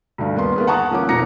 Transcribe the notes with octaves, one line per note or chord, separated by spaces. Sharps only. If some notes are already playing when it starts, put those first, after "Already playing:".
D2 G2
D#2 A#3 B3 C6
A#3 B3 G#4
F#5 A5 A#5 C#6 D#6 F#6
D#1 A#1 A#3 C#4 D6
F1 A#1 B2 A#5 A#6 C#7